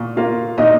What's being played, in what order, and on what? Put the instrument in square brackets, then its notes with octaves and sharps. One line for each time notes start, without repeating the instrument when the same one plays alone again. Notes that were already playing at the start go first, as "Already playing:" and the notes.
Already playing: [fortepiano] A#2
[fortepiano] A#3 [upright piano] F4 F5
[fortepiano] A#2 [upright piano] D#4 D#5